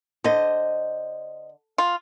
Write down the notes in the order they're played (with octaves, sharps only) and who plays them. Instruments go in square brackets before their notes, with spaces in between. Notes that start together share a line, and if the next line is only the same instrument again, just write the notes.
[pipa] D3 [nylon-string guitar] C5 D#5
[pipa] F4